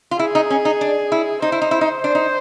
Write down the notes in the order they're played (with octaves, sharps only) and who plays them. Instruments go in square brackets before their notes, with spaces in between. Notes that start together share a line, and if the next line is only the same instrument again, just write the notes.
[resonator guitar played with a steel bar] F4
[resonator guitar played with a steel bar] E4 [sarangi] G#4
[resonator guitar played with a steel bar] D#4
C#4
D#4
D4
E4
[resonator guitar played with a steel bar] D#4 [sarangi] C5
[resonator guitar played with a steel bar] E4
D#4
E4
D#4
[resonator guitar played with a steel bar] D4 [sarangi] C5
[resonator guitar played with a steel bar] D#4